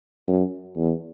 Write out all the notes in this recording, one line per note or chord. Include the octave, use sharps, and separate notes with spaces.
F#2
E2